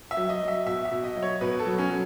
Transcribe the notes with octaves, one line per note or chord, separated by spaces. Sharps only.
E5
F#3
D#5
F#3
E5
B2 E5
E5
B2
D#5
F#3
C#5
B2 B4
A4
F#3
C#4
F#3